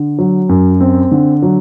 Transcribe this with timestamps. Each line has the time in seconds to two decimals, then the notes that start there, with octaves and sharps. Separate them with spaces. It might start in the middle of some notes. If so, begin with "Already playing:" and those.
Already playing: D3
0.19 F#3
0.49 F#2
0.81 C4
1.11 D3
1.42 F#3